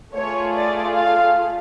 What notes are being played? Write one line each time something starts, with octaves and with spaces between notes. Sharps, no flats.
A3 F4 G#4 C#5
D5
F5